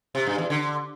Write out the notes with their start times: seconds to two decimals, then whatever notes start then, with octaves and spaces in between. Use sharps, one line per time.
0.15 C3
0.26 G2
0.38 E2
0.50 D3